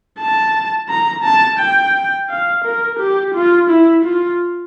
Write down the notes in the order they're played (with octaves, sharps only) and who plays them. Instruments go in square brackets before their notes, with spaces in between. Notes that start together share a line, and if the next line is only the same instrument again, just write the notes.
[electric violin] A5
A#5
A5
G5
F5
A#4
G4
F4
E4
F4